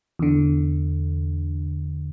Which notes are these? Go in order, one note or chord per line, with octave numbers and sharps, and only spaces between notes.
E2 D3